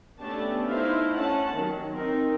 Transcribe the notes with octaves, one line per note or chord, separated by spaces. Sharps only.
A3 B3 C#4 D4 G4 A5
A3 D#4 E4 C5 E5 F5
C#4 F#5 A5
D#3 F#3
C4 D#4 A#4